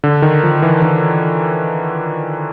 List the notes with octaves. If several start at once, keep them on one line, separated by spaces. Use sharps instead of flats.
D3
D#3
F3
E3
D#3